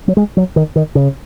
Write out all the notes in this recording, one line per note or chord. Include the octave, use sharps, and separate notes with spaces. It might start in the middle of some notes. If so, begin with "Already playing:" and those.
F#3
G#3
F#3
D#3
D#3
C#3